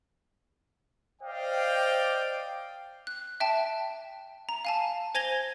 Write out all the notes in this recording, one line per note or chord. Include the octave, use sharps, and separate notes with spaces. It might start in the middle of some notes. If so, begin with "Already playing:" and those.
C5 D5 D#5 F5 G5
F#6
E5 G5 A5
A#5
F5 G#5 A5
C5 G#5 G#6 A#6 F7 G7